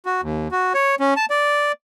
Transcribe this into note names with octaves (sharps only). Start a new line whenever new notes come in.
F#4
D#2
F#4
C#5
C#4
A5
D5